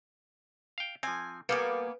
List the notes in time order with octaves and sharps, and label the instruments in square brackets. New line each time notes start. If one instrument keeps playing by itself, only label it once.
[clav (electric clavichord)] F5 G5
[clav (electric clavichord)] F3 C4 [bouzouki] G#5
[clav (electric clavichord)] G3 A4 [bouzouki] A#3 B3 G#5 [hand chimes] B4